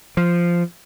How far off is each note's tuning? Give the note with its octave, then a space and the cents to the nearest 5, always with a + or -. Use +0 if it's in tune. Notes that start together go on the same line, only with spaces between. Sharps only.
F3 -10